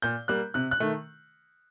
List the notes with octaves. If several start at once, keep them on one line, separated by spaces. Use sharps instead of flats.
A#2 G6
G3 A#3 F#6
C3 F#6
F#6
D#3 A3